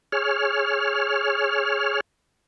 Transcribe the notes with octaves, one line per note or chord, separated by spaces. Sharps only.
G#4 C#5 F6